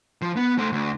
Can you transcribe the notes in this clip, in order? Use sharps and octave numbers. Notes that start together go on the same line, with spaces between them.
F3
B3
A3 C5
D2